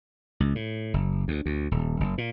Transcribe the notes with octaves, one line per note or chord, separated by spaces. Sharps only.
C#2
A2
F#1
D2
D2
D#1
F#1
A#2